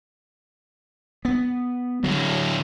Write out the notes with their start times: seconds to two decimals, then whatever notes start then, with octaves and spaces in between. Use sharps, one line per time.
1.25 B3
2.04 D2 A2 F#3